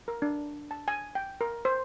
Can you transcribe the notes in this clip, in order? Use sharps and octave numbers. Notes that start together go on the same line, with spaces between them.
A#4
D4
A5
G#5
G5
A#4
C5